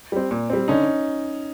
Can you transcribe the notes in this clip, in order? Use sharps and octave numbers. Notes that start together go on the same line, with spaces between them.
G3 C4
A#2
G3 C4
D3 C#4 D#4